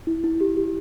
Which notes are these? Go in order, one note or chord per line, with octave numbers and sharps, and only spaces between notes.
E4
E4
G4
G4